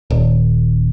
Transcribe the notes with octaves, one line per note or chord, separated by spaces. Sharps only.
D#1